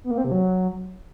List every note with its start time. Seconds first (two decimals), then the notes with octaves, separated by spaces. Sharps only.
0.04 B3
0.11 A#3
0.18 C4
0.25 C3
0.31 F#3